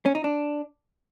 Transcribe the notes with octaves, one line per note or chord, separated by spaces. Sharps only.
C#4
D#4
D4